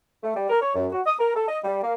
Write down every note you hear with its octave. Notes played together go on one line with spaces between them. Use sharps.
A3
G3
A#4
C#5
F#2
F#4
D#6
A#4
A4
D#5
G3
A#3